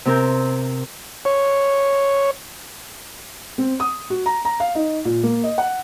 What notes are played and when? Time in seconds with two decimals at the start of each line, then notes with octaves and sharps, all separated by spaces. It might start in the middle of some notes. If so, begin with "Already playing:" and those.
0.05 C3 C4 A#4 G6
1.25 C#5
3.58 C4
3.80 D#6
4.10 F#4
4.26 A#5
4.45 A#5
4.60 F5
4.75 D#4
5.05 A#2
5.23 A#3
5.44 D#5
5.58 F#5